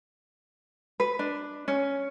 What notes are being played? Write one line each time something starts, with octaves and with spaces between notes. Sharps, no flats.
B4
D4
C#4